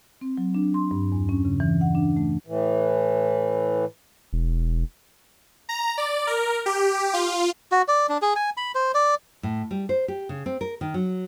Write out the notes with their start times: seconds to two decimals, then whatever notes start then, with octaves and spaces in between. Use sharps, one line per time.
0.21 C4
0.38 F#3
0.54 D4
0.74 C6
0.91 G2
1.12 E2
1.29 C#4
1.45 C#3
1.60 E3
1.81 F#5
1.95 D4
2.17 A3
2.47 A2 E3
4.33 E1
5.69 A#5
5.98 D5
6.27 A#4
6.66 G4
7.14 F4
7.72 F#4
7.88 D5
8.09 D4
8.22 G#4
8.36 G#5
8.57 B5
8.75 C5
8.94 D5
9.43 A2
9.71 G3
9.89 C5
10.08 G4
10.29 C#3
10.46 C4
10.61 A#4
10.81 D#3
10.94 F#3